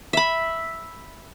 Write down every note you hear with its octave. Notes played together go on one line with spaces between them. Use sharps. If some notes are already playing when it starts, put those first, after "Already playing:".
E5 B5